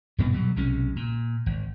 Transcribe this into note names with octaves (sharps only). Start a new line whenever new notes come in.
G2 B2 B3 C4
B2 F#3 G3
B1 C3 G#3 C#4
A#2
G#1